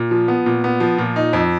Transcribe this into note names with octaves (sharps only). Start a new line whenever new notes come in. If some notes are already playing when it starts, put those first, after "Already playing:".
Already playing: A#2
F3
B3
A#2
B3
F3
A#2
D#4
F2